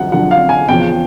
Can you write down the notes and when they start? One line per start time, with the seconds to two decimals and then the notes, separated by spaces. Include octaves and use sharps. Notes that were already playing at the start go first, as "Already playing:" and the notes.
Already playing: F#2 D3 F3 F#5
0.12 F#2 D3 F3 F#5
0.31 F5
0.49 G#5
0.68 E2 C#3 F3 G5